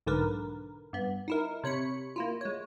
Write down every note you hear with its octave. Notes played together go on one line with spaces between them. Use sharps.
B1 G#2 D3 A#4 B4
G2 B3
D#4 E4 A#4
C3 C#5 B5 C#7
A#3 E4 F4
G#3 C#5